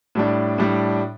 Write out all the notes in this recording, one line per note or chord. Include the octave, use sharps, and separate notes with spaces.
A2 G3 D4
A2 G3 D4